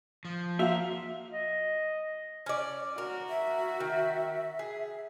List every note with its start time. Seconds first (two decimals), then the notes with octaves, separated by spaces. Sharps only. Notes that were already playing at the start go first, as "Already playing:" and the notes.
0.25 F3
0.59 A#3 F#4 E5 F5 F7
1.31 D#5
2.46 C#4 D5
2.98 F#4 A#4
3.29 E5
3.80 D#3
4.59 G#4